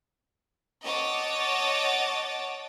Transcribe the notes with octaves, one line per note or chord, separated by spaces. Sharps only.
C#5 D#5 F#5 A5 D6 A6